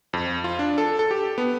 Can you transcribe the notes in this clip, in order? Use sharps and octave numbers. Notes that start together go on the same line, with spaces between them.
F2
F4
D4
A4
A4
G4
B3